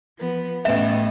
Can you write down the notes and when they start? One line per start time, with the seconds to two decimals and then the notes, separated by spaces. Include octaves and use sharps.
0.18 F3 B3
0.65 A1 A3 B3 D#5 E5 E7